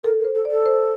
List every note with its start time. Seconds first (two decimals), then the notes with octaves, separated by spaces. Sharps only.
0.04 A4 A#4
0.19 A#4
0.25 C5
0.35 A4
0.45 D5
0.50 A4
0.66 C5